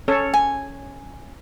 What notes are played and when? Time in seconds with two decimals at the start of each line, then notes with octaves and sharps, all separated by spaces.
0.08 C#4 A4 C#5
0.34 G#5